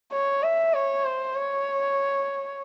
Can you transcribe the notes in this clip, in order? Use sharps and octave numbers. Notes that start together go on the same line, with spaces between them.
C#5
E5
C#5
C5
C#5